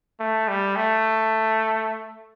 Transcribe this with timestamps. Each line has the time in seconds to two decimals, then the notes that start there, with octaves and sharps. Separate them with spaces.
0.20 A3
0.48 G3
0.76 A3